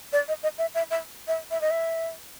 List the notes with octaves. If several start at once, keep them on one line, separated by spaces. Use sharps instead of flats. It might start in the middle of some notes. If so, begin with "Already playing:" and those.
D5
D#5
D#5
E5
E5
E5
E5
E5
D#5
E5